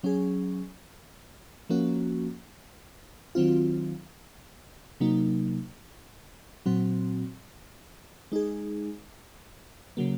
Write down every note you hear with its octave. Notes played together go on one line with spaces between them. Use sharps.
F#3 C#4 G#4
F3 A#3 C#4 F#4
D#3 F#3 C4 F4
C3 F#3 A#3 D#4
A#2 F#3 C4 F#4
G#3 D#4 G#4
C#3 F#3 A#3